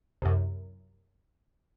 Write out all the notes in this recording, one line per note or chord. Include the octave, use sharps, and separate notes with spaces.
C2 F#2